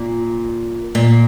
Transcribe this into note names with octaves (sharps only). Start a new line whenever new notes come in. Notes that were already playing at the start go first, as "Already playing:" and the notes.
Already playing: A#2
A#2